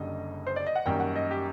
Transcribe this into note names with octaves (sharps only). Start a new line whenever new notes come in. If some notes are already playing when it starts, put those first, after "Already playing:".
Already playing: F#1 F#2 D3 G3 D#5
C5
D5
D#5
F#5
F#2 D#3 G3 A#3 G5
F#5
D#5
G4